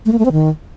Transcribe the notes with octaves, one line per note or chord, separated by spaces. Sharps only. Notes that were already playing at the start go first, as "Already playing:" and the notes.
A3
A#3
A3
C4
D#3